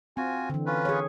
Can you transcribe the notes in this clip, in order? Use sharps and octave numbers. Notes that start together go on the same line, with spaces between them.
C4 F4 F#4 G#5
D3 E3
C#4 F4 B4
G#4 C#5